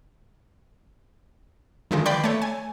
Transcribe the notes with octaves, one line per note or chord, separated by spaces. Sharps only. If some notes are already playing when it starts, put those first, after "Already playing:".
D3 D#3 F3 G#3
B4 D5 G5 B5 C6 G6
A3 C#5
G#5